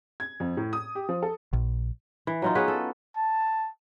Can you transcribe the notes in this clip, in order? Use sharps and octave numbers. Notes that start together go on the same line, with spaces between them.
G#6
F2
A2
D#6
G4
F3
A4
A#1
E3
F#3 D#4 F4
B3 C#4 G#4 B4
A4
A5